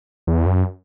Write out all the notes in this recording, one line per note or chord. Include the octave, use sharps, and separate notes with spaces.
E2
F#2